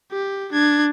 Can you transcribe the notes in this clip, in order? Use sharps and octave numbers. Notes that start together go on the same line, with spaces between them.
G4
D4 G#6